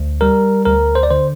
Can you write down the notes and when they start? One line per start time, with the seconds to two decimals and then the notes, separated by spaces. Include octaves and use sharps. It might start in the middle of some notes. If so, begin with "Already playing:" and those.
Already playing: D2
0.21 G3 A#4
0.65 D2 A#4
0.95 C5
1.03 D5
1.11 D3 C5